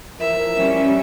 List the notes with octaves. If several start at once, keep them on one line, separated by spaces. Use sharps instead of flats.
E3 F3 A#4 E5
G3 C#4